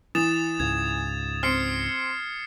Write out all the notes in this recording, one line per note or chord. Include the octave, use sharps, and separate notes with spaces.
E3 D#6 A6 E7
C#2 G#2 G#6
C4 F6 C7 C#7